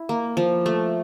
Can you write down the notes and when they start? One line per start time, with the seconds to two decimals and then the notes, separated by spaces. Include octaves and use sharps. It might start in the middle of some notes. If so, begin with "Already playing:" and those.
Already playing: E4
0.09 A#3
0.37 F3
0.66 A3